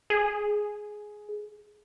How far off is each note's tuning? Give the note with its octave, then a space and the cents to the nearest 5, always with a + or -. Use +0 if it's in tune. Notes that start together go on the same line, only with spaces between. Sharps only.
G#4 +10